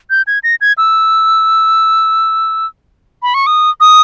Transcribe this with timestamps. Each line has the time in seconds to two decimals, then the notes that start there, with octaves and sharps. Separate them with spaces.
0.10 G6
0.27 G#6
0.43 A#6
0.61 G#6
0.78 E6
3.23 B5
3.34 C#6
3.47 D#6
3.80 D#6